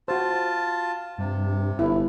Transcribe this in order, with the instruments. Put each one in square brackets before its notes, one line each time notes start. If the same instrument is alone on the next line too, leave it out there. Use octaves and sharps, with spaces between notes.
[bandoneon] F4 A5 [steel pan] F#4 C5
[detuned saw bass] G2 [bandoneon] C3
[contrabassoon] G1 [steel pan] E4